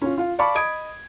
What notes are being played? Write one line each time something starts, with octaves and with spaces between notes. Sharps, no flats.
C#4 F4
F4 F5
D5 F5 A5 B5 C#6 D6
D#5 B5 D#6 G#6 D7